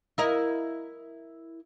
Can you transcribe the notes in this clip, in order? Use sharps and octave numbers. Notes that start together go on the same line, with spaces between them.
E4 A#4 D#5